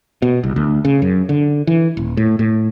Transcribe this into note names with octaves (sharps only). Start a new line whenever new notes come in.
B2
C2
D2
C#3
F#2
D3
E3
D#1
A2
A2